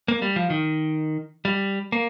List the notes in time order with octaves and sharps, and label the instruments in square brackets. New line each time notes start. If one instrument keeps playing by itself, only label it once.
[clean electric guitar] A#3
G3
F3
D#3
G3
A#3